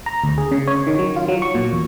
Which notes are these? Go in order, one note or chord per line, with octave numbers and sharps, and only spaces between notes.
A#5
D2
G#4
C#3
C#5
D#3
F#3
F4
F#3
C#6
A#2
E2